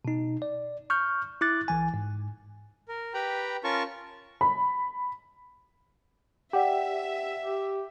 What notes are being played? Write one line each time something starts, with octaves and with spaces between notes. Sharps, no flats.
B2 D#4
D5
C#6 F6 G6
E4 D6 F#6 A6
B1 E3 G#5
G#2
A#4
G4 B4 G5 A#5 B5
C#4 F4 A#4 A5 C#6
B5
G4 D5 E5 F#5 G5
G4